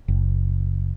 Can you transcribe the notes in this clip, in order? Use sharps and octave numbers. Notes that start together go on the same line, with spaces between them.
F#1